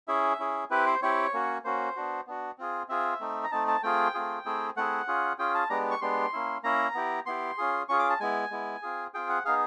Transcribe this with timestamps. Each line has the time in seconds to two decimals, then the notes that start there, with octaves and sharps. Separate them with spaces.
0.08 C#4 E4 G#4 E5
0.40 C#4 E4 G#4
0.70 C4 E4 G4 B4
0.86 C5
1.02 C4 E4 G4 C#5
1.33 A#3 C#4 F#4
1.64 A#3 C#4 F#4 C5
1.96 B3 D4 F#4
2.27 B3 D4 F#4
2.58 C4 F4 G#4
2.89 C4 F4 G#4 E5
3.20 A3 C4 D#4
3.44 A#5
3.51 A3 C4 D#4 A5
3.68 A5
3.83 A3 C4 F4 G#4 G5
4.14 A3 C4 F4 G#4
4.45 A3 C4 E4 G#4
4.77 A3 C4 E4 G#4 F#5
5.07 C#4 F4 G#4
5.39 C#4 F4 G#4 G5
5.54 A5
5.70 G#3 B3 D4 G4 A#5
5.91 C#6
6.01 G#3 B3 D4 G4 C6
6.33 A#3 C#4 E4
6.63 A#3 C#4 E4 A#5
6.95 B3 E4 G4
7.26 B3 E4 G4 C6
7.58 C#4 F4 G#4
7.89 C#4 F4 G#4 C#6
7.99 D6
8.10 A5
8.20 G#3 B3 E4 G#5
8.51 G#3 B3 E4
8.82 C4 F4 G#4
9.14 C4 F4 G#4 G5
9.29 F#5
9.45 B3 D#4 G#4 F5